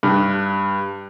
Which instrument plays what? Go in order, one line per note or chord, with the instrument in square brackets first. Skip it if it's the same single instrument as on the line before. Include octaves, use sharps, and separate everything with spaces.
[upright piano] G2